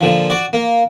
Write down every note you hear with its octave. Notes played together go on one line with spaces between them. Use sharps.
A#2 D3 F3
F#4 D5
A#3